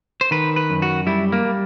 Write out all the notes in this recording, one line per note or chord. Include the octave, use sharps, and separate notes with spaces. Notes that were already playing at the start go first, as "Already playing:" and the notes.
C5
D#3 B4
B4
F#2
F#4
G3 E4
A#3
G3